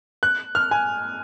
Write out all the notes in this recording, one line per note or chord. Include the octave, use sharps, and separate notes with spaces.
F#6
F6
G#5